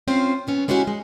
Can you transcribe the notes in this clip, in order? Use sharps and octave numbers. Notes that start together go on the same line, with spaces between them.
C4 C#4 F4 C5
F#3 B3 C#4
G#3 B3 C#4 E4 F#4 G4
G#3